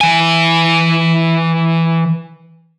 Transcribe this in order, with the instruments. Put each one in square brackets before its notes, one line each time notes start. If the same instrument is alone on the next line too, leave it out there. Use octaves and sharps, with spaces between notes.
[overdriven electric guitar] E3 G#5